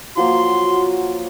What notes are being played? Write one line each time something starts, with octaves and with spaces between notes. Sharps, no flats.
F3 F#3 A#3 F#4 C6